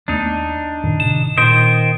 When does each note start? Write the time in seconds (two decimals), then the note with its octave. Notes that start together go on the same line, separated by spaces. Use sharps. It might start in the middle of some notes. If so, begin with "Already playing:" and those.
0.08 D#2 A3 B3 D4 D#4
0.84 F#2 A2 D#3
1.00 A2 C3 D#3 E7
1.38 A#2 D#3 C5 D#5 D7